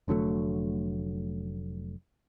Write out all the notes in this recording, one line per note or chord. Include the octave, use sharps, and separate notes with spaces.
F1 D3 F#3 A3